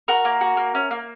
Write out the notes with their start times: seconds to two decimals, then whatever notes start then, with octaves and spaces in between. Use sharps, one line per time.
0.08 F#4 A#4
0.25 A#3
0.41 F#4
0.57 A#3
0.75 C#4
0.91 A#3